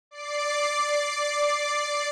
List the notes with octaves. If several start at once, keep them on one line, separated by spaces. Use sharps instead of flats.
D5 D6 C7